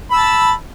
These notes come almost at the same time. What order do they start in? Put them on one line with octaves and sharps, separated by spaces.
B5 E6 A5